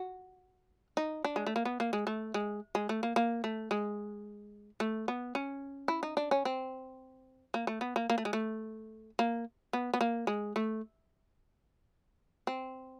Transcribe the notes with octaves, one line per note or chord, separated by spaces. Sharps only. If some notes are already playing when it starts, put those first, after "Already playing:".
Already playing: F#4
D#4
D4
G#3
A3
A#3
B3
A#3
G#3
A3
G#3
G#3
A3
A#3
A#3
A3
G#3
A3
B3
C#4
E4
D#4
D4
C#4
C4
A#3
A3
B3
A#3
A#3
A3
G#3
A3
A#3
B3
B3
A#3
G#3
A3
C4